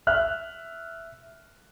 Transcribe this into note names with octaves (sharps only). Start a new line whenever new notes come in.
E5 F6 F#6